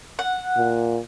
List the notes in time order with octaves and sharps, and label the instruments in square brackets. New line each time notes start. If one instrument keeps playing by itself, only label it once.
[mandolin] F#5
[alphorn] A#2